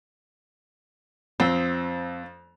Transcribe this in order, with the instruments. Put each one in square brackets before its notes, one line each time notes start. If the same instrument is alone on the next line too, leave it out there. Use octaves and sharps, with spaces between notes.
[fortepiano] F2 [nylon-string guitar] C4